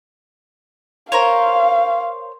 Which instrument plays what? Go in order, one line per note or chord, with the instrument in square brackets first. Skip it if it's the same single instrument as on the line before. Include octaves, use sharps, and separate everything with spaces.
[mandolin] A#4 C5 C#5 [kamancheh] F5